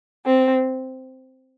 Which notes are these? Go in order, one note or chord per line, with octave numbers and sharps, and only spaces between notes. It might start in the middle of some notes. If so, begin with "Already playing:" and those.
C4